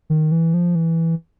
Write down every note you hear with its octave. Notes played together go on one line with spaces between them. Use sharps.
D#3
E3
F3
E3